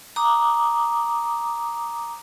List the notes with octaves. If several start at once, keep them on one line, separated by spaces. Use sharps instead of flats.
A#5 D6 D#6